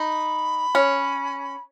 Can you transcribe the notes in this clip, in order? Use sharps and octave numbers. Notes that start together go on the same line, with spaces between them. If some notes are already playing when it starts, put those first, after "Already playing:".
Already playing: D#4 B5
C#4